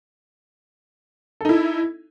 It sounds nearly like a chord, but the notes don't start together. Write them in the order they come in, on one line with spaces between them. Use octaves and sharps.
A4 D#4 E4